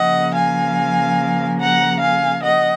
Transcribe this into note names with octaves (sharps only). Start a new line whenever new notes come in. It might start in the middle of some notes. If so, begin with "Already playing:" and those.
Already playing: C#3 F3 A#3 D#5 F#5
F5 G#5
F#5 A#5
F5 G#5
D#5 F#5